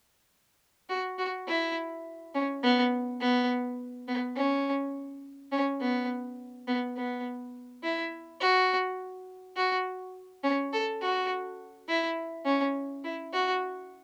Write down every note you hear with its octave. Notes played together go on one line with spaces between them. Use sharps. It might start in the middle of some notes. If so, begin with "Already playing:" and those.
F#4
F#4
E4
C#4
B3
B3
B3
C#4
C#4
B3
B3
B3
E4
F#4
F#4
C#4
A4
F#4
E4
C#4
E4
F#4